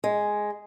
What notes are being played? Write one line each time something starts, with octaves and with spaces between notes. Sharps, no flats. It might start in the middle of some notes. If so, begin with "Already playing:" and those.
G#3